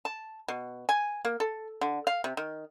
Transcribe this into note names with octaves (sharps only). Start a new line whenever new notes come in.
A5
B2
G#5
A#3
A4
D3
F5
C3
D#3